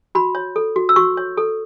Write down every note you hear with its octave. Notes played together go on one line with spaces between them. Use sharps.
F#4 B5
C#5
A4
F#4
E6
F#4 C#6
C#5
A4